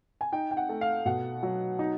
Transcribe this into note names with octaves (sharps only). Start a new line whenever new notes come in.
G#5
D#4 G5
G5
F#5
A3
F5
B2 F#5
F#3
D#4